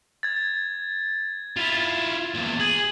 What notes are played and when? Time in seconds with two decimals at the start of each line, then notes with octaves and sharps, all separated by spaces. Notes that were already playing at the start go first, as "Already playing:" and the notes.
0.23 G#6 A6
1.57 E4 F4
2.35 E2 A#2
2.60 G#4 G#6 F#7